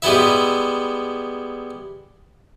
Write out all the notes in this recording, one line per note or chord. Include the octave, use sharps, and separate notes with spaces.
G3 G#3 B3 E4 E5